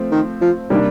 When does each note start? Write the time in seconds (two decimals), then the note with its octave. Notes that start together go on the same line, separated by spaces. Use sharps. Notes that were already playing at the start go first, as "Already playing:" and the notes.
Already playing: F3 A3 C4
0.11 D#3
0.41 F3
0.70 C3 D#3 G3 A#3 D4